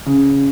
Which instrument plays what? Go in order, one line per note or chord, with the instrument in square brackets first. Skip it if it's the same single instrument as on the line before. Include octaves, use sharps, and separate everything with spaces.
[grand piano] C#3